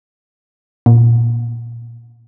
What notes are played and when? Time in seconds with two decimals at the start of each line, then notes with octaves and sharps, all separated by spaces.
0.86 A#2